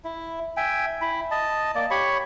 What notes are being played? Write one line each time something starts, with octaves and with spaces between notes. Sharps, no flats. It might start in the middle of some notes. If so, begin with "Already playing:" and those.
E4
E5 G5 G#5
E4 B5
D#5 A5
A#3 D5
G4 C#5 B5 C#6